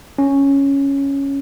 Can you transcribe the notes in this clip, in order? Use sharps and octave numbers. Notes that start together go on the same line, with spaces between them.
C#4